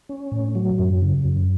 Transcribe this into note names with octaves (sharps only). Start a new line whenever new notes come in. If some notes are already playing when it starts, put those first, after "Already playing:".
C#4
A2
F#3
F#2
C#3
F#2